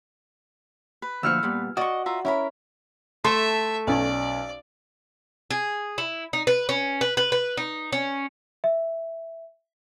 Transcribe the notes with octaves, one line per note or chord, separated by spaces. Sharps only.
B4
D2 A#2 F3 E6 F6 C#7
A#2 G3 B3
F#4 D5 D#5 C#6
F4 E5 A#5
C#4 E4 A#4 B5
A3 A4 E5 C6
B1 C#4 D5
G#4
E4
D#4
B4
C#4
B4
B4
B4
D#4
C#4
E5